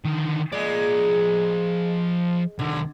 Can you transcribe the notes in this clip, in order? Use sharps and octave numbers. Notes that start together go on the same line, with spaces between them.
D3 D#3
F3 G#3 D5
C2 D3 D#3